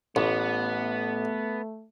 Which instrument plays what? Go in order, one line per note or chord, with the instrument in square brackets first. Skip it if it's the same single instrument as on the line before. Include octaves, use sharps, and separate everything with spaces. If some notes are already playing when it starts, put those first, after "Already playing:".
[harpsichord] A1 [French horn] A3 [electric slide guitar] B3